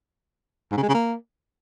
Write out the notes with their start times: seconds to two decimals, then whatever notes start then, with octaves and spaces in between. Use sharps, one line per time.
0.72 G#2
0.77 C#3
0.83 G#3
0.89 C#3
0.95 A#3